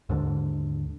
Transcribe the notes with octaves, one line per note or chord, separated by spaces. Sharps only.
D#2 G#2 D3